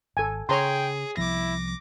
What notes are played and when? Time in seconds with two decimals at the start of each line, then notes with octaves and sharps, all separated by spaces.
0.17 G#1 A4 G#5
0.49 C#3 G#4 C#5 G5 A#5 C6
1.17 C2 F3 B3 E4 D6 A#6